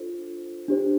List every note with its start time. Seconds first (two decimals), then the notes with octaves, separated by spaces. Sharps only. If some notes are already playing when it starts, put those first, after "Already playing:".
Already playing: D4 F4 A4 C5
0.68 D4 G4 C5